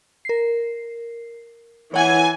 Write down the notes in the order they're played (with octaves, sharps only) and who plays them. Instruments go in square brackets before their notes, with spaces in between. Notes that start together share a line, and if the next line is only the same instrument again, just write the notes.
[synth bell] A#4 C7
[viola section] E3 G#5 [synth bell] C#5 F#5